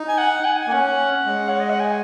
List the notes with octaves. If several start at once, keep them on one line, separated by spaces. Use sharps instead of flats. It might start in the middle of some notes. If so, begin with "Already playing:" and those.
Already playing: D#4
G#5
F#5
G#5
G#5
A#3
C#4 F#5
G#3
C#5
D#5
F#5
G#5